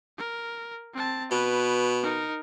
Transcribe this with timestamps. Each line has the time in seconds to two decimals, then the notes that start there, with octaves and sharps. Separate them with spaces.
0.18 A#4
0.94 C4 A5
1.31 B2 B4
2.03 D#4 A#4